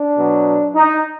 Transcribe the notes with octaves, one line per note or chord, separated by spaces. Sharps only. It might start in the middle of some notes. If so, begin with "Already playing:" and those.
Already playing: D4
B2 F#3
D#4